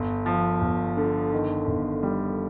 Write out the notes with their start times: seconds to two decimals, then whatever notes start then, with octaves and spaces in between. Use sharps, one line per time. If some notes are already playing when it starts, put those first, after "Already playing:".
Already playing: G1
0.26 F3
0.61 G1
0.97 D3
1.33 D#3
1.67 G1
2.03 G3